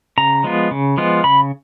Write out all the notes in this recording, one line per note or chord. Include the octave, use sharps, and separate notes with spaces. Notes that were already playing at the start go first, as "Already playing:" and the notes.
C#3 A#5
F3 G#3 B3 F4
C#3
F3 G#3 B3 F4
C#3 B5